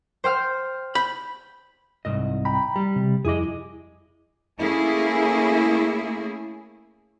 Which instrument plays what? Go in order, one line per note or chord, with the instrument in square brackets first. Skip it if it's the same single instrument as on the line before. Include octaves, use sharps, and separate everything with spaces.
[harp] C5 G5 F6
[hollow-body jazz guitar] B5 [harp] G6
[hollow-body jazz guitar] C2 G#2 D#5
[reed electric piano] G5 A#5 B5
[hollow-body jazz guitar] G3
[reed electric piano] C3
[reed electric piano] F2 E4 D6 [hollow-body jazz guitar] G#4 D#5
[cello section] A3 A#3 C#4 E4 G#4